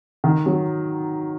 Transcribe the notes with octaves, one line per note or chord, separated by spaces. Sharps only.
D#3
F#3